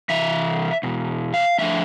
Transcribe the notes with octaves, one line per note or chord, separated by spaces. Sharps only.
C3 E3 E5
E2 B2
F5
A2 F3 A3 D4 E5